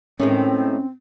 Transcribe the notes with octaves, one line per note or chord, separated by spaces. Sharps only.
A2 D#3 G#3 C4 C#4